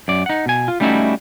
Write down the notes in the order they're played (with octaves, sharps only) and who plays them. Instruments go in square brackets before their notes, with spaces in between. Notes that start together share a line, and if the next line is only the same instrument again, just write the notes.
[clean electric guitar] F#2 D5
D#4 F#5
B2 G#5
F4
G3 A3 C#4 D#4 E4 F#4